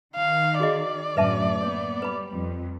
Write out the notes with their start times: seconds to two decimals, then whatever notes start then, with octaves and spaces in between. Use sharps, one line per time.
0.16 D#3 F5
0.60 F#4 G#4 D5 D#5
1.17 F#2 A2 D3 B4 E5 A5
1.61 A#3 B3 C#5
2.02 G3 B4 B5
2.34 F2